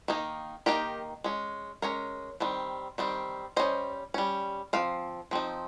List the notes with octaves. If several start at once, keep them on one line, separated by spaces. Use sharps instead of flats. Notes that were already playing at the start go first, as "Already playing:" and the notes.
D#3 A#3 D#4
D#3 A#3 D#4 G4 A#4
G#3 C#4
G#3 C#4 A#4 C#5
D#3 G3 C4
D#3 G3 C4
G3 C#4 C5 D#5
G3 C#4
F3 C4 F5
F3 C4 D#4